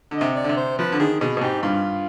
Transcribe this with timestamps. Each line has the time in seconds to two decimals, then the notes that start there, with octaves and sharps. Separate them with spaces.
0.11 D3 D#5
0.21 C3
0.35 D5
0.44 D3
0.49 C3
0.57 C5
0.79 F3 B4
0.92 D3
0.99 D#3 G#4
1.21 B2 G#4
1.37 B2
1.41 G#2 G4
1.63 G2 F4